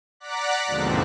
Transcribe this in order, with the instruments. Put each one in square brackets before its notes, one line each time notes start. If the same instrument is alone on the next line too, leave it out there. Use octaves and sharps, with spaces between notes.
[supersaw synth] D5 F#5 A#5 D6 F#6 B6
D#2 G#2 B2 D3 F3 C4